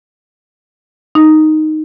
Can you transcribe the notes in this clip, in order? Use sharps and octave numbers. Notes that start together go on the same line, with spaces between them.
D#4